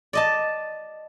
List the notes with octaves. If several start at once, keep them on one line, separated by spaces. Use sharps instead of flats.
D5 D#5 A5